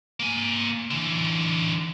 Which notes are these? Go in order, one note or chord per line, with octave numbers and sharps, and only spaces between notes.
A#3 G#5
D3 E3